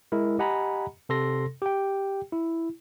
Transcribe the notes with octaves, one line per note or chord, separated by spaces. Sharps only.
G#3 E4 A#4
G4 D#5 F#5 G#5 A#5 B5
C3 A4 C6 A#6
G4 G5
E4